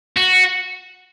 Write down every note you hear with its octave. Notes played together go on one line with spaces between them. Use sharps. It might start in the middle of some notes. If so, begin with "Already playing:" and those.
F#4